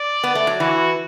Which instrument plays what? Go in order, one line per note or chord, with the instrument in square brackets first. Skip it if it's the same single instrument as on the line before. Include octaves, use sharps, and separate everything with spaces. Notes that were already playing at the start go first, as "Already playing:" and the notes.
Already playing: [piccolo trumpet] D5
[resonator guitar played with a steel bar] B3
A3
F#3
[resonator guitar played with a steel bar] E3 [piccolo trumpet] F#4